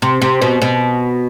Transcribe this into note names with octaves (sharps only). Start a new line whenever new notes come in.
C3
C3
B2
B2